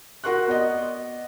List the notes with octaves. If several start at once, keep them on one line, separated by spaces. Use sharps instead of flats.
F#4 A#4 C6 C#6 F#6
B3 D5 D#5